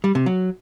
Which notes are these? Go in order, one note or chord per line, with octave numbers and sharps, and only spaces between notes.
G3
C3
F#3